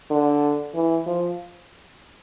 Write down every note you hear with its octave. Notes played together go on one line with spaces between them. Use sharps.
D3
E3
F3